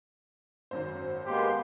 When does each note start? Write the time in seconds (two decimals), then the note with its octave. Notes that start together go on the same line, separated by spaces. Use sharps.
0.71 G#1 F#2 C5
1.26 G#3 A#3 B3 G4 C6